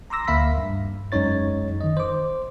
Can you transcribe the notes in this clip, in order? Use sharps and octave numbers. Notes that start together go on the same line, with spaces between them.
A#5 C6 D6 E6 A#6
D2 A#3 E5 F5 B5 B6
G2
F#2 G#3 C#4 D#4 C#5 A6
D#3 D#5
C5 D6